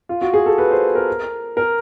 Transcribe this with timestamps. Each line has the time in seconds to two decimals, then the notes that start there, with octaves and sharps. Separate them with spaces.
0.09 F4
0.21 F#4
0.34 G#4
0.46 A4
0.58 B4
0.71 C5
0.95 A#4
1.57 A#4